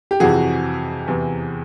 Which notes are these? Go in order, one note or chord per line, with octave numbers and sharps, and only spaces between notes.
G4
F2 C3 E3 F#4 G#4
E2 C3 E3